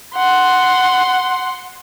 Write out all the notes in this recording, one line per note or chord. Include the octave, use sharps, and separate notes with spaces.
F#5 C6